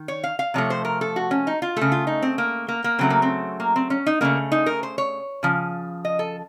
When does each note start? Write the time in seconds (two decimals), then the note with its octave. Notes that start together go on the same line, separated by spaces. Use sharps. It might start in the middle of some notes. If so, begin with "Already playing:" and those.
Already playing: D#3
0.08 C#5
0.24 F5
0.39 F5
0.54 C3 F3 A3 C#5
0.70 C5
0.85 A#4
1.01 A4
1.16 F#4
1.31 C#4
1.47 D#4
1.62 F4
1.76 C#3 A3 A4
1.92 F4
2.07 D#4
2.22 C4
2.38 A#3
2.68 A#3
2.84 A#3
2.99 C#3 F#3 A3 C4
3.10 A#3
3.22 C4
3.60 A#3
3.76 C4
3.90 C#4
4.06 D#4
4.21 C#3 A3 A#3
4.52 D#4
4.66 A#4
4.83 C5
4.98 C#5
5.43 C#3 F3
6.05 D#5
6.19 A4